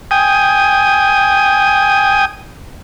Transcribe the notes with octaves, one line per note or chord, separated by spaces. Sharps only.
G5 G#5 D#6